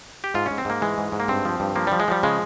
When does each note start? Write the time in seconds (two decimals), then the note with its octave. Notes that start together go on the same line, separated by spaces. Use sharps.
0.24 G4
0.34 G#2 F4
0.46 G#2 C#4
0.58 C4
0.65 G#2 A#3
0.81 E3 G#3
0.98 G#2
1.12 G#2
1.20 A#3
1.28 G2 C4
1.45 F3
1.60 G2
1.76 F3 A#3
1.87 F3 G3
2.00 G#3
2.08 F3 G3
2.23 C#3 G#3